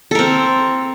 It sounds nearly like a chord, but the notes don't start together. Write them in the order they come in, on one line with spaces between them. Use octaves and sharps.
A4 A#4 C4